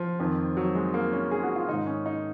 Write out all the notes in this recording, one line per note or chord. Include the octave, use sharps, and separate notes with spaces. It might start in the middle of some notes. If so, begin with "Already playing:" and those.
Already playing: F3
F2 D#3
F#3
G#3
A#3
C#4
G#4
F#4
F4
G#2 D#3 D#4
C#4
D#4